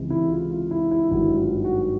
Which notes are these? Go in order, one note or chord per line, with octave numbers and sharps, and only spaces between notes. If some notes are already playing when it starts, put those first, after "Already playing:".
Already playing: C#2 C3 E3 G#3
E4
F4
F4
E4
E4
G#1 G2 D#3 F#3 E4
F4
F#4